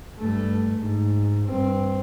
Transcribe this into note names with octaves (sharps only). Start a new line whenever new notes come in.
G2 A3
G#2
G2 C4